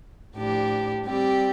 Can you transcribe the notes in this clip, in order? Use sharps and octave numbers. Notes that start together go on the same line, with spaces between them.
A2 F3 D4 G4 D5
G3 C4 G4 D5